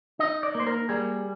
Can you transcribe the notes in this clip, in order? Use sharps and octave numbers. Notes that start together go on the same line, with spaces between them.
D#4 D#5
D5
A#3
C5
A#4
G3 G#4